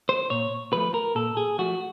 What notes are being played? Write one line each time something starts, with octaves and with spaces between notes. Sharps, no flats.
C5
A#2 C#5
F3 A3 B4
A#4
A#2 A4
G#4
F3 A3 F#4